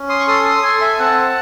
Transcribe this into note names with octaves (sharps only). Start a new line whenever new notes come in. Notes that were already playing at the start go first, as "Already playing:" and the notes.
Already playing: C#4
C6 D#6
C#6
A4 C6 D#6
C6 D#6
A4 G#5 C6
E5 G#5
C4 F#5 A5